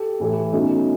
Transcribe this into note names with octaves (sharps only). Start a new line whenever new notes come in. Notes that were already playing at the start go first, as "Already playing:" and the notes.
Already playing: G4 A4
A2 E3 A3
B2 F#3 A3 C#4 D#4